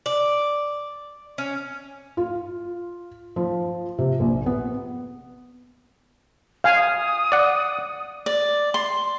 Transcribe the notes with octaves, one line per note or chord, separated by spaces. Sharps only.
D5
C#4
F4
F3
C3
A#1
B3
F5 G#5
D#6
D5 F#5
D5
C6